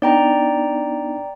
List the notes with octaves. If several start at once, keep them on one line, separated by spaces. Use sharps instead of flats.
B3 D4 D#4 D5 G5 A#5